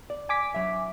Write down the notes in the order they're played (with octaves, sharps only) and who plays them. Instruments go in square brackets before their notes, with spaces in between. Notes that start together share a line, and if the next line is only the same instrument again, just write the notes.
[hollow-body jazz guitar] D5
[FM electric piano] G#5 D6 B6
[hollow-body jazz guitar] F#3 E5